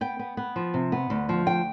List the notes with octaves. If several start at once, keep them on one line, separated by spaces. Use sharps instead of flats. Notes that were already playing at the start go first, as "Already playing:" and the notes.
B3 G5
B3
B3
F3
C3
B3
D2
F3
D2 G5